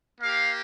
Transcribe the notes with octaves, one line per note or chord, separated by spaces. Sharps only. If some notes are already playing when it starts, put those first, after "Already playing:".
A#3 G4 F5